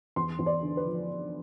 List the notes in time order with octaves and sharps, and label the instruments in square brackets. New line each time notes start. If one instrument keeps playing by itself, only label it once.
[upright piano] E2 C6
E2
D5
D3
B4
F3